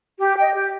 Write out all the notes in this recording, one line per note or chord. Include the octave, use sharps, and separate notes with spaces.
G4
D#5 G5
G4